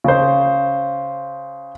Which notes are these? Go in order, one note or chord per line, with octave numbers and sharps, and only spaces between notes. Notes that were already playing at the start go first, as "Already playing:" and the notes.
C#3 C5